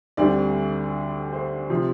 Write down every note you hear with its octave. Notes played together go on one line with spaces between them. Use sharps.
D2 D3 G3 C4 D5
C5
C3 F3